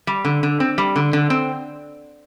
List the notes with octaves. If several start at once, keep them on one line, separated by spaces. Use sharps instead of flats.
G3
D3
D3
C4
G3
D3
D3
C4